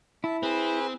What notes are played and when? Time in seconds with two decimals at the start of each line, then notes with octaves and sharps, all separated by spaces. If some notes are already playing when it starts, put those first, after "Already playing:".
0.24 E4 E5 A5
0.43 C4 G#4 B4